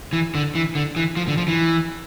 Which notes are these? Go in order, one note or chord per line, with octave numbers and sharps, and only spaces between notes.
E3
D3
E3
D3
E3
F3
D3
F3
E3